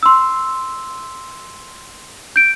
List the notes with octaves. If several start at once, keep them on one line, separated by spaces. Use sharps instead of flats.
C6 E6
G6 D7